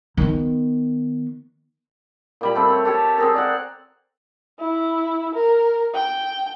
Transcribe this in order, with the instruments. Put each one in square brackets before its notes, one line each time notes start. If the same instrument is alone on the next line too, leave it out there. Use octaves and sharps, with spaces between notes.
[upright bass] D#3 B3
[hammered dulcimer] A#2 G3 B5
A3 C4
C#5
A3 G4 C#5 A5
C4 G#4 A#4
D5 F5 F#5
[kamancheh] E4
A#4
G5